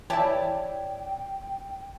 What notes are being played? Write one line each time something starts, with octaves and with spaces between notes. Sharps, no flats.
E3 E4 G4 C#5 D5 G5 A5